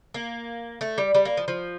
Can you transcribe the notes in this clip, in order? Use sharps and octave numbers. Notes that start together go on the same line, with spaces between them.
A#3
A3
G3
G3
A#3
F3
F3